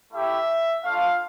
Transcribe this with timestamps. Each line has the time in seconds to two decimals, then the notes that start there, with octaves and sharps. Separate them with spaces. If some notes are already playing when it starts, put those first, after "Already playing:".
0.12 A3 E4 G4 E5
0.84 A3 D4 F4 F5